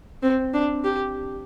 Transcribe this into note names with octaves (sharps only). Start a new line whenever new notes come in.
C4
D4
G4